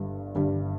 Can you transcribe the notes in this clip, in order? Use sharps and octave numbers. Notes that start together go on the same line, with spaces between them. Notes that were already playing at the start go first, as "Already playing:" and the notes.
Already playing: G1 G2 G3
G1 G2 G3